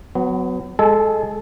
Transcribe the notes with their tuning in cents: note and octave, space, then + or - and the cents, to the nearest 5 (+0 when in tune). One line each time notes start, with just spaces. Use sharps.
F#3 +0 B3 +30
G#3 +0 A4 -15 G#5 +30